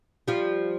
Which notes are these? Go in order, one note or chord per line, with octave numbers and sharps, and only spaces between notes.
F3 G3